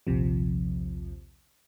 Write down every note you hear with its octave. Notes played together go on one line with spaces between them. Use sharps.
A#1 D#2 C3 F3